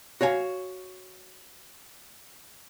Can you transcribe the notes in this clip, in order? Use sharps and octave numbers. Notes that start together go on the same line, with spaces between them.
F#4 C#5 F5 G#5